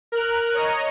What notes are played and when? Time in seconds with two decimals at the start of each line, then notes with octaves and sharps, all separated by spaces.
0.12 A#4 F6 F#6
0.54 C#5 D#5 A#5